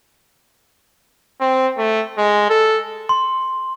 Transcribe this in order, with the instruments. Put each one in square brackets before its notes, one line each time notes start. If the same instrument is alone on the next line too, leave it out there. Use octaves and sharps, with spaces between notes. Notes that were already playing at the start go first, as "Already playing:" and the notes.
[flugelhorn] C4
A3
G#3
A4
[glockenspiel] C6